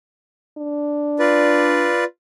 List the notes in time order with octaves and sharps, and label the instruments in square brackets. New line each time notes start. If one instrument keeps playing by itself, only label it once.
[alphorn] D4
[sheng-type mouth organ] F4 B4 D5